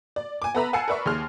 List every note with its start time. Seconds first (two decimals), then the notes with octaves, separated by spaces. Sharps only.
0.16 D5
0.42 G#5 D6
0.55 B3 A4 B4 E5 A#5 B5
0.73 F#5 G#5 A5 E6 C7 C#7
0.88 A#4 B4 D5 E5 C#6
1.06 D#2 G#4 C6 F6